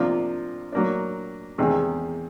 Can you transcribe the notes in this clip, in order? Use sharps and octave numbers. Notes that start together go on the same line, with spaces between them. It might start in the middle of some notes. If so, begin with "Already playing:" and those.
Already playing: C3 F3 A#3 D4 F4
F#3 A#3 D4
E2 C3 D#3 G#3